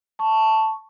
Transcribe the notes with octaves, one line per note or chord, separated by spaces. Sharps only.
A5 C#6